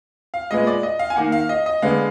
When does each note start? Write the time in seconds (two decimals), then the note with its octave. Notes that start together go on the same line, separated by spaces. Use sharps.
0.34 F5
0.51 A#2 G#3 B3 D#5
0.67 D5
0.83 D#5
0.99 F5
1.10 G#5
1.16 D#3 A#3 F#5
1.32 F5
1.49 D#5
1.66 D#5
1.82 D3 G#3 B3 F5